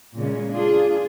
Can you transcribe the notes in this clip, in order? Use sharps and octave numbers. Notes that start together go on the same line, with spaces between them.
A#2 C#3 F#3 G#3 C#4
D4 F4 G#4